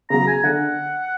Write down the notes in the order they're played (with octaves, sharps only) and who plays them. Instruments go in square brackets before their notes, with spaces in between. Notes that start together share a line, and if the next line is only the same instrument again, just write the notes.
[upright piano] C#3 F#3 [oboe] A#5
[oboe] G#5
[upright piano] D3 [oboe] F#5